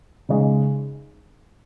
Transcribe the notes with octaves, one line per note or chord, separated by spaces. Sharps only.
C#3 G#3 D#4